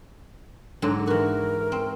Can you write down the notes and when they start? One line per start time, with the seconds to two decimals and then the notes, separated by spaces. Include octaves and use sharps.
0.82 G#2 D3 F#3
1.07 E3 F#4 A#4
1.72 C4